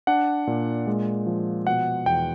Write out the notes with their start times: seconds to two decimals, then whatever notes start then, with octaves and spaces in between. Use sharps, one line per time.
0.07 D4 F#5
0.47 A#2
0.87 G#3
1.27 F3
1.67 B2 F#5
2.06 E2 G5